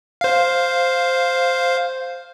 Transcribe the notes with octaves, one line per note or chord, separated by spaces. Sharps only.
C5 F5